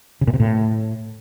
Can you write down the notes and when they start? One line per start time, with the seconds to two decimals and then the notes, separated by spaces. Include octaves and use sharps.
0.21 C#3
0.27 A#2
0.34 C3
0.40 A2